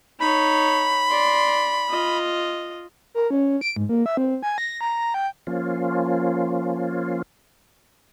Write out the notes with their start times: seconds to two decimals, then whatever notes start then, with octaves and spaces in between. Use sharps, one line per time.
0.20 D#4 C#5 B5
1.09 D5 C6
1.89 F4 D#5
3.15 A#4
3.31 C#4
3.61 D7
3.76 G#2
3.89 A#3
4.06 E5
4.17 C4
4.43 G#5
4.58 A#6
4.81 A#5
5.14 G5
5.47 F3 A#3 C#4 F4